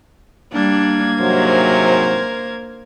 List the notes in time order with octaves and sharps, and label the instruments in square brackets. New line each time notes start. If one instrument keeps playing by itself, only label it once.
[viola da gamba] G3 D4 [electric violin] A#3 G#6
[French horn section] G#2 C3 F#3 [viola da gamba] A#4 C5